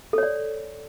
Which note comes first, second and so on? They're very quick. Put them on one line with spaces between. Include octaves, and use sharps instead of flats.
A4 C#5 D5